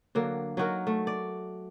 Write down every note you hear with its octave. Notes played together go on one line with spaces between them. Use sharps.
D3 F#3 A#3
F#3 D#4 F#4 A#4
A3
D5